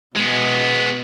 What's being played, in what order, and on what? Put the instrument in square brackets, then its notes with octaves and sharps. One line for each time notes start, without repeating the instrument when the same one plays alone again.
[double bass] B2 [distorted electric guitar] G#3 B3